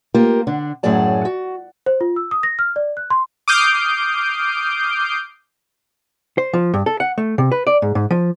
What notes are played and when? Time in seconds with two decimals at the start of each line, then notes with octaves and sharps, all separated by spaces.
0.14 A#3 F4 G4 A#4
0.47 D3 D4
0.83 F#2 A2 F#3 G#4 D5 A5
1.25 F#4
1.86 C5
2.01 F4
2.16 E6
2.31 D#6
2.43 A#6
2.59 F6
2.76 D5
2.97 F#6
3.10 C6
3.48 D6 D#6 F6 G6 C7 D7
6.38 C5
6.53 F3
6.74 G2
6.86 A4
7.00 F#5
7.18 A3
7.38 C3
7.52 B4
7.67 D5
7.82 G#2
7.95 G#2
8.11 F3